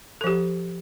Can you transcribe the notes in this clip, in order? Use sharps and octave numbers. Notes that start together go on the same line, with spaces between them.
F3 G4 A4